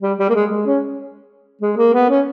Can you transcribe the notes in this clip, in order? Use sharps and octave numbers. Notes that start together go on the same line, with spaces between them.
G3
G3
A#3
G#3
G#3
C#4
G#3
A#3
B3
C#4